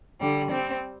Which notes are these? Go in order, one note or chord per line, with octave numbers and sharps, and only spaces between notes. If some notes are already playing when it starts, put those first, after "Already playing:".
D3 G3
G3 C4